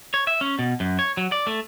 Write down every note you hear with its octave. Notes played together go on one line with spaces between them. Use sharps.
C#5
E5
C#4
B2
F#2
C#5
F#3
D5
A3